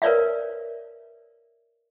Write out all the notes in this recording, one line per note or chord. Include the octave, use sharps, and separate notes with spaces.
A#4 B4 C#5 D5 E5 F5